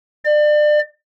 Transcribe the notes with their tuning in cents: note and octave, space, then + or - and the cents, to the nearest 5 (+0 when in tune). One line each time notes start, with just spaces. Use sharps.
D5 +30